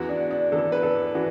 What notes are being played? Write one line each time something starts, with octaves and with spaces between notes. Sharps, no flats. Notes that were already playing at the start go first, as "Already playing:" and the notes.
Already playing: E2 E3 F#4
D4
D4
E2 E3 A4
B4
A4
E3 F#4